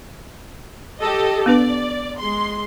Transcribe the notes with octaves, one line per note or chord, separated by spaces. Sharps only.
G4 A4 D#5
B3 D4 B4 D5
G#3 C6